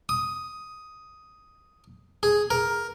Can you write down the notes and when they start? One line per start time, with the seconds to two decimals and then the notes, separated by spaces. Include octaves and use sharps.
0.09 D#6
2.23 G#4
2.50 A#4